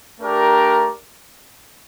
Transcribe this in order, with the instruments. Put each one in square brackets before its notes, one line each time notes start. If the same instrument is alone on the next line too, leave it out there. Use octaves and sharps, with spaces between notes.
[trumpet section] A3 D4 G4 A#4 D5